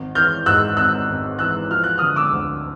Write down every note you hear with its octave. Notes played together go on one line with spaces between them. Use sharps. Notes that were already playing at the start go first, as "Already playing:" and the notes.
Already playing: G#1
E3 F6 G6
G#2 E6 F#6
G#1 E6 F#6
G#1
E3 E6 F#6
F3 F6
F#6
D3 D#6 F6
D6 E6
D2